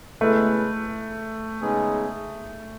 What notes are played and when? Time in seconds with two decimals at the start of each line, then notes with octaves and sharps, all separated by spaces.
0.20 C#3 G#3 A3 B3 E4 B4
1.61 C#3 G#3 B3 D#4 G#4